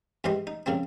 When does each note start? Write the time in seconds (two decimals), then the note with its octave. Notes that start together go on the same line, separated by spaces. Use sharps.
0.24 E2 G#2 E3 G4 D#5 C6
0.47 D#4
0.66 F2 A#2 C#3 A#3 C4